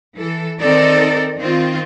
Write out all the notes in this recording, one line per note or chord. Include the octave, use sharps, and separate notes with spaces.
E3 A4
D#3 C4 D#4 A4 A#4 D5
D#3 C4 F4